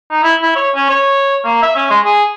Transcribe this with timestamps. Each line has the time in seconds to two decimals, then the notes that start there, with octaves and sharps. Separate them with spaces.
0.11 D#4
0.23 E4
0.42 E4
0.56 C#5
0.76 C#4
0.90 C#5
1.45 A#3
1.62 E5
1.76 C#4
1.90 G#3
2.05 G#4